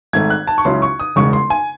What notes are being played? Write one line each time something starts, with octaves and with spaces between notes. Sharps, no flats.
G#1 G#2 D#3 A3 G#6
F#6
A5
C#6
C#2 C#3 F#3 C#4 E4 C6
C#6
D#6
E1 E2 C#3 G#3 C#6
C6
G#5